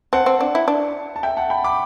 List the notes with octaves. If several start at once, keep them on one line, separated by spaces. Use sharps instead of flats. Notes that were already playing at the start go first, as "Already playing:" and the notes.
C4 F#5 A5
C4
D4
E4
D4
A5
E5 G5
F#5 A5
G5 B5
B5 D6